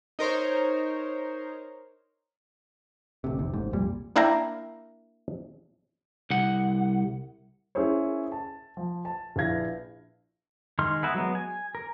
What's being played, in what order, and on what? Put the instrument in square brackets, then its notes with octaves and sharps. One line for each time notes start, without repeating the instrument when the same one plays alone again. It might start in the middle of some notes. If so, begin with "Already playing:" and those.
[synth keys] D#4 A#4 C5 C#5
[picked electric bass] A1 D2 C3
F1 D#2 C3
A1 G#2
C2 F2 A#2 G3
[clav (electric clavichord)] A#3 D4 E4 F5 G5 A#5
[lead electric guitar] C2 F#5
[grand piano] C#4 E4 G#4 A#4 C5 C#5
A5
F3
A5
A#1 E4 B4 F5 G#6 A#6
[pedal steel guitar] D#3 G#3 C6 F6
B3 G#4 A#4 B4 E5
F#3 G#3 B3
G#5
A#4